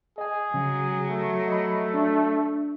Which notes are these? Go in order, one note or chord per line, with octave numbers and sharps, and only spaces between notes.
G#4 D#5 G#5
C#3 F#3
A3
D#5 B5
D4